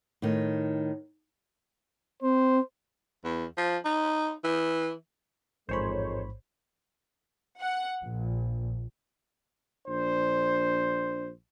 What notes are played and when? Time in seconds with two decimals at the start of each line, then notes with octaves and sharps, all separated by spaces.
0.22 A2 D#3
2.22 C4 C5
3.24 E2
3.57 F3
3.85 D#4
4.44 E3
5.69 A1 F2 G#2 G#3 A#4 C5 C#5 B5
7.59 F#5
8.00 A#1
9.86 A#1 D4 C5